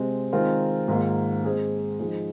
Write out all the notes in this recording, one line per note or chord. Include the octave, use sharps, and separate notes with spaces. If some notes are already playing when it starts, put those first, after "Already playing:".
Already playing: C3 G#3 C4 G#4
D#3 G#3 C4 F4 A#4
G#2 D#3 A#3 F4
G#3 C4 G#4 C5
F3 G#3 D#4 G#4